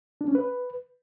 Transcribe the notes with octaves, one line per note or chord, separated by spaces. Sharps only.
D4
C#4
B4